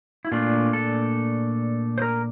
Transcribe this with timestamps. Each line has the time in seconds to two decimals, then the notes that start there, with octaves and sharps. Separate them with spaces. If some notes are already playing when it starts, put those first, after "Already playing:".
0.25 E4
0.32 A#2 A3 D4 F4
0.73 A4
1.98 C5
2.02 A#4